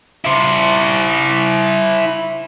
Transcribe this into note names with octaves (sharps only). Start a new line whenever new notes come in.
E4 C5